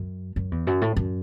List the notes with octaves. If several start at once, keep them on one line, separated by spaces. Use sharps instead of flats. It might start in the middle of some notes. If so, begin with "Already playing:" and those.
Already playing: F#2
F#2
E2
F#2
A2
F#2